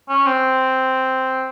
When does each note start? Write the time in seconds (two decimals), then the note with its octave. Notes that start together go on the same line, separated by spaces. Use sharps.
0.09 C#4
0.26 C4